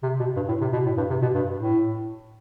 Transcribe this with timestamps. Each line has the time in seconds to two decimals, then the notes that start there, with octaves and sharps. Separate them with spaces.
0.03 C3
0.19 B2
0.36 G2
0.48 A2
0.61 C3
0.73 B2
0.85 A2
0.97 G2
1.10 C3
1.22 B2
1.34 G2
1.58 A2